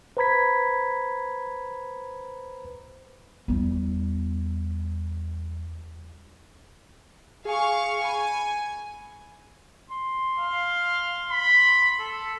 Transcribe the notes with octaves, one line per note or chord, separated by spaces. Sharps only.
B4 C5 A#5 B5 G#6 B6
E2 G3
G#4 F5 G#5 C#6
G#5 B5
C6
F5
B5
A4